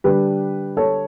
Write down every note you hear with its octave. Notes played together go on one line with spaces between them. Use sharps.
D3 G3 D4 G4 B4
A4 C#5